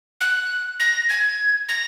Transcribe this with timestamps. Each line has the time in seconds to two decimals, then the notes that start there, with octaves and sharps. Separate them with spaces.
0.21 F#6
0.80 A#6
1.09 G#6
1.69 A#6